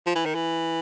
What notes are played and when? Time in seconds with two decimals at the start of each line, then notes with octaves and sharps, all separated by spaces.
0.06 F3
0.15 E3
0.25 D#3
0.35 E3